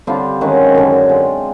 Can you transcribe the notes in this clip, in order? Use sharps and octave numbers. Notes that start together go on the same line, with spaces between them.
D3 G3 C4 F4
D#3 G#3 C#4 F#4
F#2 D3 F#3
G#3 C4 F4